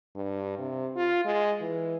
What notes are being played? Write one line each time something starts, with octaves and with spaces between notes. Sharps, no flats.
G2
C3
F4
G#3
E3